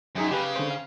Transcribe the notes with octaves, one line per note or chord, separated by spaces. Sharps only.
F#2 D#4 G#4 G5
C#3 G4 B4
D3 C4 C5
F5